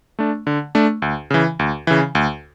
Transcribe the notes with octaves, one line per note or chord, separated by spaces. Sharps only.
A3 D4
D3
A3 D4
D2
C#3 E3
D2
C#3 E3
D2